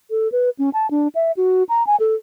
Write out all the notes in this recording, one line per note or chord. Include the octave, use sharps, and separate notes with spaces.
A4
B4
C#4
A5
D4
E5
F#4
A#5
G#5
A4